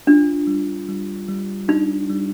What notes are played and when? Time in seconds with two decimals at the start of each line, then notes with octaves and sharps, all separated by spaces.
0.07 D4 F4
0.47 G3
0.88 G3
1.28 G3
1.68 D4 D#4
2.10 G3